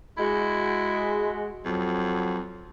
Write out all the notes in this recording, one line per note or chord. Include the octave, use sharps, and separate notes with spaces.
G#3 E4 F#4
F2 F#3